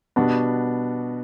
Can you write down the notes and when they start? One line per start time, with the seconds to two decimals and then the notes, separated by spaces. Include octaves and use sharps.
0.16 B2 G3 B3 D4 F#4